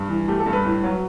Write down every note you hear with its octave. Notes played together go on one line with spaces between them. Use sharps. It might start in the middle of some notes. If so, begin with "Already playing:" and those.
Already playing: G2
E3
A3 G4
A4
G2
B4
A2
F#3